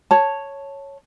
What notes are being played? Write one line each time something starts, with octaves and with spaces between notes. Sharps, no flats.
C#5 A5